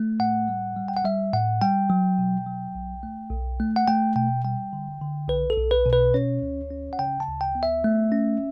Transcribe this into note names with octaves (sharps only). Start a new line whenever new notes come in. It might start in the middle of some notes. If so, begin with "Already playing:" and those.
Already playing: A3
A2 F#5
G3
G3
G5
F#5
G3 E5
A2 F#5
G3 G5
F#3
B2
F#3
B1
A3
B1
A3
F#5
A3 G5
B2 G5
G3 G5
D3
D3
B1 B4
A4
B1
B4
B2
B4
C#4 C#5
D2
C#4
F#5
C#3 G5
A5
D2
G5
B3
E5
A3
C#4